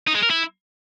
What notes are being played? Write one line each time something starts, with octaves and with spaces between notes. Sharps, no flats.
D#4
G#3
A#4
E4